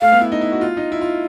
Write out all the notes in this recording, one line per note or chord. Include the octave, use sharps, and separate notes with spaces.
A3 F5
B3
E4
D#4
E4
F#4
F4
D#4
E4
F4